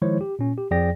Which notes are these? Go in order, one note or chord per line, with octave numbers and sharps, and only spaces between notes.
D#3 F3 G#3 E4 C5 C#5
G4
A#2 C#4
G4
F2 F3 G#4 D5 G5 A#6